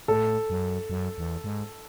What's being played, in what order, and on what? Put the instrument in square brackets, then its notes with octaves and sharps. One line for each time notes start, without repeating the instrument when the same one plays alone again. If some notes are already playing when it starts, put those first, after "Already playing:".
[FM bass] A2 [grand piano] A4
[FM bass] F#2
F#2
E2
G#2